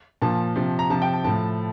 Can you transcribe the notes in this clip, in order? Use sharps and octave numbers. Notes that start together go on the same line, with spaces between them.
A#2 F3 A5
C3 F3
A#5
C3 F3 A5
G5
A5
A2 F3 A5